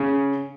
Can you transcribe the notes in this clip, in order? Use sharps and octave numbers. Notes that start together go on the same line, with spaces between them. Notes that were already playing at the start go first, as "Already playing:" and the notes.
Already playing: C#3